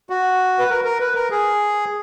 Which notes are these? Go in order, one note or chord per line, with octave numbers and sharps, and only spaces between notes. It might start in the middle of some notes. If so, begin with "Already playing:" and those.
F#4
B4
A#4
A#4
B4
A#4
G#4